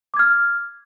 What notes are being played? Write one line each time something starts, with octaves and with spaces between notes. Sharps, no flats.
D6 F6 G#6